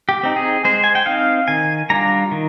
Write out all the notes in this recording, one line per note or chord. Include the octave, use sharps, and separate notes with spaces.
G4
C4 D#4
G#4
G#3 C5
G#5
G5
C4 D#4 F5
D#3 G#5
G3 D4 F4 A#5
D#3